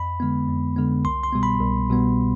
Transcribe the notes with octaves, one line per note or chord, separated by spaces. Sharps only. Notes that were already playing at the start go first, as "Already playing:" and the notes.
Already playing: F2 B5
D3 G#3 B3
F2
D3 G#3 B3
C2 C6
C6
B2 G3 B3
B5
C2
B2 G3 B3